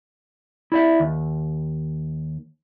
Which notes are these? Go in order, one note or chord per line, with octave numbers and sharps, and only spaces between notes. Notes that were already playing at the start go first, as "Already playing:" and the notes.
E4 D5 E5
D#2